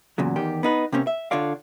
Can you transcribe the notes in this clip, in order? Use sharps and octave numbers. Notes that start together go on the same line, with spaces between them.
E2 A#2 C#3 F#3
E2 D#3 G4
B3 D#4 B4
C3 A#3 C4 C#4
E5
D3 F4 C#5 D5 F5